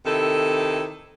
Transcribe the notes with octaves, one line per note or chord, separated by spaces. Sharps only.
C3 D#3 E4 A4